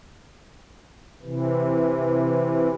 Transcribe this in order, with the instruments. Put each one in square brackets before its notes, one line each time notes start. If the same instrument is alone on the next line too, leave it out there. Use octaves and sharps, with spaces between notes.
[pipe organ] C3 E3